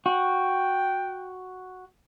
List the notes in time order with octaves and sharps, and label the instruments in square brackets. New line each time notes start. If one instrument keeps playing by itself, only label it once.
[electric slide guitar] F#4 [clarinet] G5